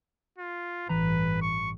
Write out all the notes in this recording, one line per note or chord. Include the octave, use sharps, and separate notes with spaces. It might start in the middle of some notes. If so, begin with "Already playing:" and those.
F4
A1 G2 E3 B4 A#5
C#6